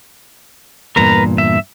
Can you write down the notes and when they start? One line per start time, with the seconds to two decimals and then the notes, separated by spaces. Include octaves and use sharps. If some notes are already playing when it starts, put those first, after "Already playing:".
0.96 E2 G2 A#2 A#4 B4 A#5
1.38 E5